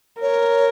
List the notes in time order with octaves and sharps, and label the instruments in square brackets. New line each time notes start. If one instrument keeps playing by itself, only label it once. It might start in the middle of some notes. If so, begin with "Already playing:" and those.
[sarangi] A#4 [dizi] C#5